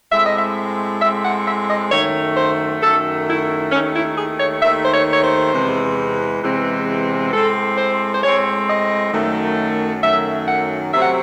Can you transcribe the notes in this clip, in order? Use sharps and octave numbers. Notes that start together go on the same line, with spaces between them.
A2 G#3 C4 E5
D#5
E5
A2 G#3 C4 E5
F#5
E5
D#5
F#2 D#3 A3 C#5
C5
F#2 D#3 A3 A4
E4
D#2 D#3 A3 C#4
E4
G#4
C#5
D#2 D#3 A3 E5
C5
C#5
C#5
C5
E2 C3 E3 G#3 C4
E2 C3 E3 G#3 C4
A2 G#3 C4 A4
C5
C5
A2 G#3 C4 C#5
D#5
F#2 D#3 F#3 A3
F#2 D#3 F#3 A3 E5
F#5
C3 F#3 A3 C4 E5
F#5